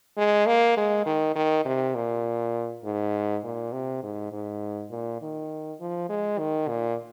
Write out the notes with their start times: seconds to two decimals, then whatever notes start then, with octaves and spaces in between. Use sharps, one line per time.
0.17 G#3
0.46 A#3
0.77 G#3
1.06 D#3
1.35 D#3
1.65 C3
1.95 A#2
2.84 G#2
3.43 A#2
3.73 C3
4.03 G#2
4.32 G#2
4.91 A#2
5.21 D#3
5.80 F3
6.09 G#3
6.39 D#3
6.68 A#2